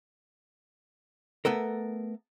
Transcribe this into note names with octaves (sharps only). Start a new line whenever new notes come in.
A3 B3 A4 A#4